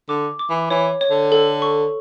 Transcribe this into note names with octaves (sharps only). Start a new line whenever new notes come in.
D3 D6
D6
E3
E3 C#5
C#5
D3
A4
C#6